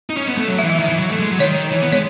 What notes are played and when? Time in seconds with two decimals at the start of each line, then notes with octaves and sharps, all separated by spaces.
0.10 D#4
0.17 C#4
0.28 B3
0.37 A3
0.48 F#3
0.59 E5
0.63 E3
0.69 E5
0.79 D#3
0.89 E3
0.99 F#3
1.10 A3
1.20 G#3
1.30 F#3
1.40 D#3 C#5
1.72 E3
1.82 B3
1.92 G#3 C#5